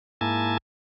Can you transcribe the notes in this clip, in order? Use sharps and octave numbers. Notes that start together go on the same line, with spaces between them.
G#2 A#3 E4 G#5 A5